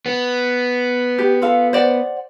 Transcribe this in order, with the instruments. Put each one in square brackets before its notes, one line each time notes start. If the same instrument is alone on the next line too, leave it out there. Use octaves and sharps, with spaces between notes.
[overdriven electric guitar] B3
[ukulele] G4
F4 A4 F5
C5 D5 F#5